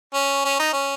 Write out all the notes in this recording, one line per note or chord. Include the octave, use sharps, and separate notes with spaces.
C#4
C#4
D#4
C#4